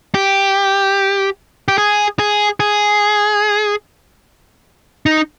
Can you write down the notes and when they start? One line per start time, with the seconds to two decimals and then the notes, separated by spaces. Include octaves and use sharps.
0.15 G4
1.68 G4
1.78 G#4
2.19 G#4
2.60 G#4
5.06 D#4